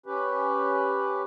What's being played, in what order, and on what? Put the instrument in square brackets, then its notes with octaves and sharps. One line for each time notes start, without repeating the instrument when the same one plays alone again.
[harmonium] C#4 G4 B4